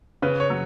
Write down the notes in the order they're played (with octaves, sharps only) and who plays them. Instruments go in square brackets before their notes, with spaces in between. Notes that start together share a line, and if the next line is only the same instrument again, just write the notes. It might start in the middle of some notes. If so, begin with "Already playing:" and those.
[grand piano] C#3 B4
C#5
F#3